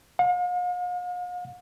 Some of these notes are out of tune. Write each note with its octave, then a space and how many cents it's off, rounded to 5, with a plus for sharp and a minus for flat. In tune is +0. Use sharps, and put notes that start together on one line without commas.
F5 +45